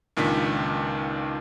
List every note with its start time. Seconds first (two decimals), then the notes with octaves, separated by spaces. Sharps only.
0.17 C#2 A#2 D#3 D4 B6